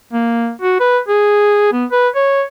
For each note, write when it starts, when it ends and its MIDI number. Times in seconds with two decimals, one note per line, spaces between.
0.13 0.51 58
0.62 0.77 66
0.80 0.99 71
1.08 1.72 68
1.72 1.85 59
1.92 2.09 71
2.15 2.43 73